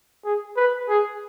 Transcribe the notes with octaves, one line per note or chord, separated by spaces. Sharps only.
G#4
B4
G#4